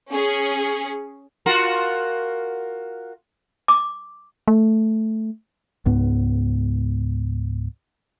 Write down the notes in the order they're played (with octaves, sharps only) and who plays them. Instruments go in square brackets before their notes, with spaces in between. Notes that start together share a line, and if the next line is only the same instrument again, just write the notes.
[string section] C#4 G#4
[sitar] F4 F#4 A#4
[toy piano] D6
[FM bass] A3
[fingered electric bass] C#2 G#2 B3